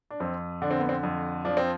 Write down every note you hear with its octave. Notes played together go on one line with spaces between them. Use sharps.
D4
F2 C4
D3 D4
C4
B3
C4
F2
F3 D4
C4